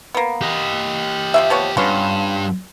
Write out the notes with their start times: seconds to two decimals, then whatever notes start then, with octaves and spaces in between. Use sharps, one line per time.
0.14 A#3 B3
0.41 G4 D#5
1.34 F3 A#3 E5
1.50 F3 B3 C#5
1.77 G2 B3 C#4 F4